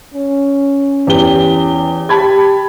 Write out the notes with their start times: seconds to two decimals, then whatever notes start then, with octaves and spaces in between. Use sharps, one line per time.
0.14 C#4
1.07 E2 G4 G7
2.09 G4 A5 B5 G#6